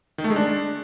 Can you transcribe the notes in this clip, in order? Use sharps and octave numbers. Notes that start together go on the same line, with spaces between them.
D#3
A3
G#3
D4